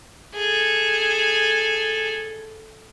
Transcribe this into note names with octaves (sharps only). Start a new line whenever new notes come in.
G#4 A4